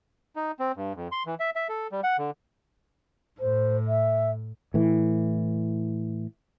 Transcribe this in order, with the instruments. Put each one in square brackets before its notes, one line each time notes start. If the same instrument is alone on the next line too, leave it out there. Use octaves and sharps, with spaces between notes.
[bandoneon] D#4
C4
G2
F2
C6
E3
E5
E5
A4
G3
F#5
D3
[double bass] A2 [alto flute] C5
[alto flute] E5
[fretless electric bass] A2 E3